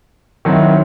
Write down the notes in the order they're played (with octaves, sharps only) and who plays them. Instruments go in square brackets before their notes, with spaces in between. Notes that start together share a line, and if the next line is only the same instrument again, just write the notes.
[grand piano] D#3 F#3 C4 E4